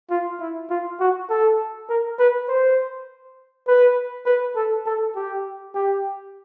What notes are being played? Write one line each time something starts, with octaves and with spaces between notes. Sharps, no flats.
F4
E4
F4
F#4
A4
A#4
B4
C5
B4
B4
A4
A4
G4
G4